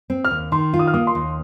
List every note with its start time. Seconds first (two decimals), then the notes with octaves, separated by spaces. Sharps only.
0.10 C4
0.25 F6
0.31 D#2
0.52 D#3 C6
0.74 F4
0.79 D#6
0.87 F6
0.94 A#3 D#6
1.07 C6
1.15 D#2